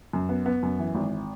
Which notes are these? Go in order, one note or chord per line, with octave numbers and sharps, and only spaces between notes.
F#2
B3
B3
F#2
E3
G#1